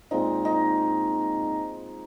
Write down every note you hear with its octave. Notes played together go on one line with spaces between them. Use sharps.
A#2 G#3 C4 D#4
D#4